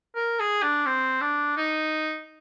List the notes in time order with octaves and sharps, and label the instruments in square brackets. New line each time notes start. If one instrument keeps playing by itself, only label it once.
[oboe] A#4
G#4
D4
C4
D4
D#4